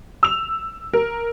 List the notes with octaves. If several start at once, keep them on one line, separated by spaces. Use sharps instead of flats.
E6 F7
A#4